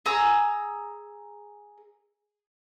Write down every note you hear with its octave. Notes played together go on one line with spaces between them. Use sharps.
G#4 A#5 E6